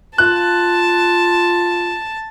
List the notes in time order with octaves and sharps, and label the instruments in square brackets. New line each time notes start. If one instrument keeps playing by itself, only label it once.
[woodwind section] F4 [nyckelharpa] A5 [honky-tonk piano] F#6